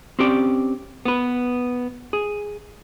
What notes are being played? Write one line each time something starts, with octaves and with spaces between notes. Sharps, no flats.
C4 C#4 G4 D5
B3 B4
G#4